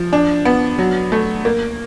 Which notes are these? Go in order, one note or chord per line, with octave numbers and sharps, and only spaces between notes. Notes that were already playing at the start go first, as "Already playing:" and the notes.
Already playing: F3
D4
B3
F#3
A3
A#3